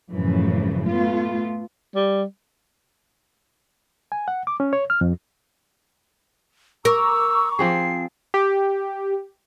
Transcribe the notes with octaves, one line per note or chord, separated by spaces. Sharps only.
F#2 A2 C#3 E3 F3
A3 B3 F4
G3
G#5
F#5
D6
C#4
C#5
F6
F2
A#4 A#5 C#6 D6 E6
F3 C4 G#4 C7
G4